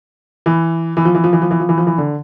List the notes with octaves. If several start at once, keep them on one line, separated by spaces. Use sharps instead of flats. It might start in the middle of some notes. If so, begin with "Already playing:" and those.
E3
E3
F3
E3
F3
E3
F3
E3
F3
E3
F3
E3
D3